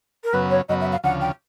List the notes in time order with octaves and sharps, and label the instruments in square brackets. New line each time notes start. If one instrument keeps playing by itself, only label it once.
[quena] A#4
[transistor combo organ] F#2 C#3 F#3 B3 [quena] B4
[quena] C#5
[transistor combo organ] F#2 C#3 F#3 B3 [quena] D#5
[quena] E5
F5
[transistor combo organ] D2 C#3 F3 [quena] F#5
[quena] G5